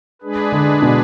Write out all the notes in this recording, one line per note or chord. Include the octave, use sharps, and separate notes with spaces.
G#3 D4 G#4 B4
D3
B2